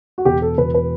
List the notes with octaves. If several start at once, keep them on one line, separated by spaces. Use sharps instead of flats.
F#4
E1 G4
A4
E1 B4
B4